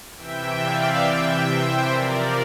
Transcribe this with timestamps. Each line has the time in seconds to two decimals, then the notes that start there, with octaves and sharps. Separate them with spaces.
0.16 C3 E3 E5 G5
0.60 D5 F5
1.02 C3 E3 E5 G5
1.46 C5 E5
1.89 C3 F3 A#4 D5